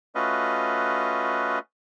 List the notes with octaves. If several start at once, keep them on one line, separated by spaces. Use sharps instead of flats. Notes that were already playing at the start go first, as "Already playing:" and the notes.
A3 C#4 F4 F#4 B4 D#5